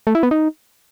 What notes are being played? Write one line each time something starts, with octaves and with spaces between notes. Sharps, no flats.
A3
E4
B3
D#4